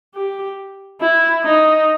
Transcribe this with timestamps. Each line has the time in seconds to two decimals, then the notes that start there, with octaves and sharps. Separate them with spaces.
0.15 G4
1.01 E4
1.44 D#4